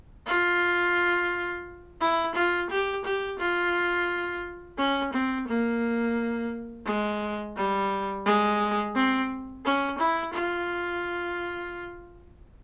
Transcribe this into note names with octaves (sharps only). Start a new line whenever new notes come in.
F4
E4
F4
G4
G4
F4
C#4
C4
A#3
G#3
G3
G#3
C4
C#4
E4
F4